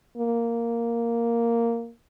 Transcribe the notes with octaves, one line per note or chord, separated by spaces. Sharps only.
A#3